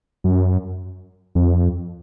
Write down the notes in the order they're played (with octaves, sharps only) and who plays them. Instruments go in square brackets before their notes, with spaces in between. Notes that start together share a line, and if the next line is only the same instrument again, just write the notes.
[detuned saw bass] F#2
F2